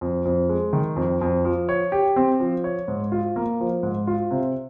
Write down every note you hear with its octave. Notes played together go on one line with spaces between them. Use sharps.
F2
F2
G#3
D#3
F2
F2
F3
C#5
G4
C4
F3
C#5
G#2
F4
A#3
F3
G#2
F4
C3